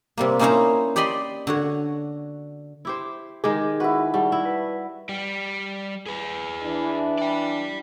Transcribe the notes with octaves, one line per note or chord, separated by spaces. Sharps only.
C3 G3 A#3
A#3 C#4 D#4 E4 C5 A#5
G4 D5 D#5 B5 C6
D3 F#4 C#5
E4 G4 C5
D#3 G#3 G4 G#4
E4 F#4 B4
G3 F#4 A5
E4
B4
G3 G4
G#4 B4
E3 D4
D5 G5